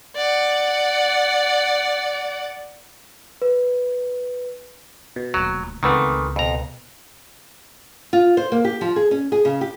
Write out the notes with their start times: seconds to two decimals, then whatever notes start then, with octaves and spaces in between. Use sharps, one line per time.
0.16 D5 F#5
3.42 B4
5.16 B2
5.34 D#1 D2 F#3
5.83 C#2 D#3 E3 A3 B3 C4
6.36 F2 B2 A#5
8.13 F4
8.37 C5
8.52 A#3
8.65 G4
8.81 F3
8.96 G#4
9.11 C#4
9.32 G#4
9.45 C#3
9.61 G4